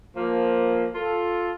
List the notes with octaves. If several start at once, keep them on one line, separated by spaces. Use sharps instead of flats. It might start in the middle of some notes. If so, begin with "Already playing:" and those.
F3 A#3
F4 A4